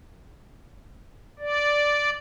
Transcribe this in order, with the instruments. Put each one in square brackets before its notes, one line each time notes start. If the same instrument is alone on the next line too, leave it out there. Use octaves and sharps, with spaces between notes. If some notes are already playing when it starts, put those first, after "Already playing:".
[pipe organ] D5